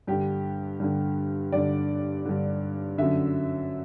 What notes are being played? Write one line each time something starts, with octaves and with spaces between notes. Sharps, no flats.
G2 D3 G4
G2 D3
G2 D3 D5
G2 D3
F#2 D3 E5